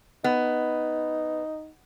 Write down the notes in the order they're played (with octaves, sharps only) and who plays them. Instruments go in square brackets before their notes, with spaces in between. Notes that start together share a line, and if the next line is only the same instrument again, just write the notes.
[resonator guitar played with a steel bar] B3 [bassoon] D#4